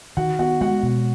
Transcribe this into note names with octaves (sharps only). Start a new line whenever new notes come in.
D#3 F#4 F#5
B3 F#4 F#5
G#3 F#4 F#5
B2